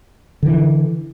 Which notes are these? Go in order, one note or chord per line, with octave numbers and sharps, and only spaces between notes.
D3 E3